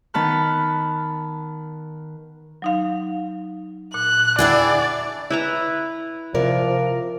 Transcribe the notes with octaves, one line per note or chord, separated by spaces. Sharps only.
D#3 B3 A5 B5 F6 F#6
F#3 D#4 F5
A#2 F#6
D4 E4 G#4 D5 F#5 G5
E4 B4 A#5
C3 F3 A#4 D5